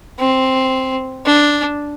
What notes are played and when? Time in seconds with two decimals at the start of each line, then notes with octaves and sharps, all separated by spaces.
0.19 C4
1.26 D4